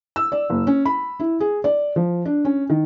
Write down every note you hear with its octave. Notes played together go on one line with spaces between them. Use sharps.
E6
D5
F#1
C#4
B5
E4
G#4
D5
F3
D4
C#4
D#3